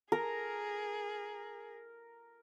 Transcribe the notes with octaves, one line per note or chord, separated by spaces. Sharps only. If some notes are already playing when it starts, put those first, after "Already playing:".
G#4 A#4